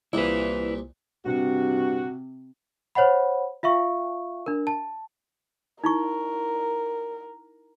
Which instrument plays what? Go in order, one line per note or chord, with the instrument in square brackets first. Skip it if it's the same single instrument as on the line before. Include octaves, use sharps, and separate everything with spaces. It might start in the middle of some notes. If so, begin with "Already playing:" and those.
[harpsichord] C2 A#2 [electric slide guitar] E4 B4
[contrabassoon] G2 [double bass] C3 [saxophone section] F#4
[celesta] C5 C#5 D#5 F#5 B5
F4 E5 F5 C#6
D4 A#4
A5
[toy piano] D#4 E4 C#6 [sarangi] A#4